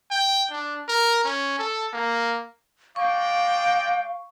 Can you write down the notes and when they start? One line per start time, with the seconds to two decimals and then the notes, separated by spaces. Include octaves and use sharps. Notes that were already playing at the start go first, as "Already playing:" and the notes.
0.11 G5
0.51 D4
0.88 A#4
1.25 C#4
1.59 A4
1.93 A#3
2.96 G#3 D5 F5 G5 C#6